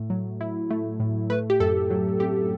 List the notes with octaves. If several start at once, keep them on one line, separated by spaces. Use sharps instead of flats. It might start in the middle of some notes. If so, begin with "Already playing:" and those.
Already playing: A2 A3
F#3
E4
A3
A2
A3 B4
G4
F#2 A4
F#3
C4 G4